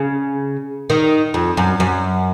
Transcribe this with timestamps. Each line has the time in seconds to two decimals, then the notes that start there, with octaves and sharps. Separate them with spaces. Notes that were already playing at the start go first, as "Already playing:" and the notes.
Already playing: C#3
0.90 D#3
1.34 F2
1.57 F#2
1.80 F#2